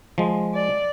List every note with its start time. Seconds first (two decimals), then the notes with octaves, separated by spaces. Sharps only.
0.18 F3 G#3
0.54 D5